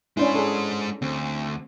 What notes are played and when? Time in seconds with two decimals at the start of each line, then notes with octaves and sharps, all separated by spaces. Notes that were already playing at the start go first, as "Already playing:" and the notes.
0.17 G#3 C#4 D4 E4 C5
0.35 G#4 A4
1.02 D2 C4